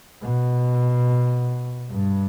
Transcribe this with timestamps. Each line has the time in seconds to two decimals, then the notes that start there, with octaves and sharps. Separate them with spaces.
0.23 B2
1.91 G2